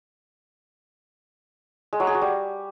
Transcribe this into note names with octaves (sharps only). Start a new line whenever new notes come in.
G#3
F#3
G#4
F#4
G3